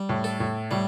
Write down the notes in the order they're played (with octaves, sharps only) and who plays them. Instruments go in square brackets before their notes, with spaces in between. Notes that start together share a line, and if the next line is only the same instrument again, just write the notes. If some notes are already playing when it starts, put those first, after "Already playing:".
Already playing: [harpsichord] G3
[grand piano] A2
[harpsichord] A4
[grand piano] A2
[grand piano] A2 [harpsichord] G3